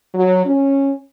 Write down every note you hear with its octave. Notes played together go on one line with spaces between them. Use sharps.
F#3
C#4